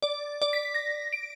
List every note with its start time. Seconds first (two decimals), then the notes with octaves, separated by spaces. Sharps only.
0.02 D5
0.42 D5
0.53 B6
0.74 A#6
1.13 D7